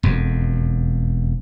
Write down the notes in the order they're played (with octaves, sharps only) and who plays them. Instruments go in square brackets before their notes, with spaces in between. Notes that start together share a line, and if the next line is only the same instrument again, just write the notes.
[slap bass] E1 F2